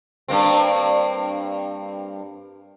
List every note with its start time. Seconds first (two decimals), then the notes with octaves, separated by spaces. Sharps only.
0.28 G2 A#3 C4